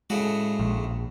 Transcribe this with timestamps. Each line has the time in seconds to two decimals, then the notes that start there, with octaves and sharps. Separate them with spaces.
0.10 A2 C#3 G#3 F#4
0.60 A#1